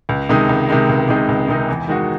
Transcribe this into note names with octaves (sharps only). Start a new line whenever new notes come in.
C#2
C3 D#3 G#3 D#4
C#2
C3 D#3 G#3 D#4
C#2
C3 D#3 G#3 D#4
C#2
C3 D#3 G#3 D#4
E2
D#3 G#3 D#4 F#4